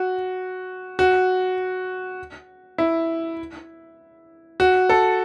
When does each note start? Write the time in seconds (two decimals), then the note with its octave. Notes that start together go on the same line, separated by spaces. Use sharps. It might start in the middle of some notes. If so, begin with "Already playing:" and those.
Already playing: F#4
0.99 F#4
2.78 E4
4.60 F#4
4.89 A4